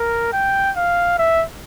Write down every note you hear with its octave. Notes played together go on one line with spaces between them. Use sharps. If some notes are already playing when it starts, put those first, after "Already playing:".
Already playing: A#4
G5
F5
E5